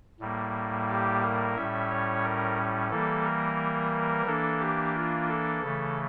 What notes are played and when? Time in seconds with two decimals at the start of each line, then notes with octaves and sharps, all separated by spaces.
0.20 A2 G3 A#3
0.88 G4
1.22 A#4
1.55 A2 G3 C#4 E5
1.90 C#5
2.23 A#4
2.91 E3 G3 A#3 A4
3.25 A#4
4.26 E3 A#3 D4 A4
4.60 G4
4.95 F4
5.29 A4
5.62 C#3 E3 A3